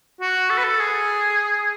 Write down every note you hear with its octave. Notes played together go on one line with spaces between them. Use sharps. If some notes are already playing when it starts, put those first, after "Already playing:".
F#4
A4
B4
A4
G#4